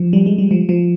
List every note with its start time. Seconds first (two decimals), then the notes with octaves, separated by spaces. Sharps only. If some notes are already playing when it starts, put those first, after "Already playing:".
Already playing: F3
0.13 G3
0.26 G#3
0.38 G3
0.51 F3
0.69 F3